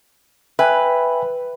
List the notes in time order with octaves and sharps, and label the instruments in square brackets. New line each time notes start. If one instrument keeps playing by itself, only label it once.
[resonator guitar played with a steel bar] B4 [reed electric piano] E5 G5 G#5